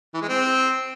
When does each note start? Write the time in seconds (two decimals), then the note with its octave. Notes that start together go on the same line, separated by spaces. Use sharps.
0.14 E3
0.21 G#3
0.29 C4